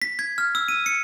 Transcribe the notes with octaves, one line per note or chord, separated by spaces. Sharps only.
B6
G#6
F6
E6
D#7
C#7